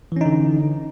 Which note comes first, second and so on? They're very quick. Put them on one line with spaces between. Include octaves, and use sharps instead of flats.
E3 C#4 D#4 D3